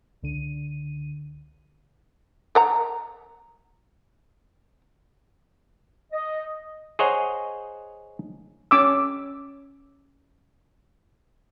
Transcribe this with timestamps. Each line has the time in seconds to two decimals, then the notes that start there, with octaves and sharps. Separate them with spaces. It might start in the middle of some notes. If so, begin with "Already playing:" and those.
0.22 C#2 D3 D#7
2.55 A#4 F#5 A#5
6.13 D#5
6.99 G#4 C5 C#5 D#5 F#5 A#5
8.71 C#4 D6 E6